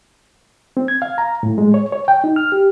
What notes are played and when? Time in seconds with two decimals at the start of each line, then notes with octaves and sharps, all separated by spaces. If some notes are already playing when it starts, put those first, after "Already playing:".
0.77 C4
0.88 G#6
1.02 F5
1.18 A#5
1.43 A2
1.58 G#3
1.74 C#5
1.92 C#5
2.08 G5
2.24 D#4
2.36 F6
2.52 G4